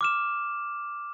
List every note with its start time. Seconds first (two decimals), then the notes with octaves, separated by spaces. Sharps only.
0.01 D6 F6 E7